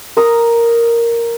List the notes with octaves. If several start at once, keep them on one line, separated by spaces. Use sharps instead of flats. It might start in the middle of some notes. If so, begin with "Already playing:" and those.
A#4 D#6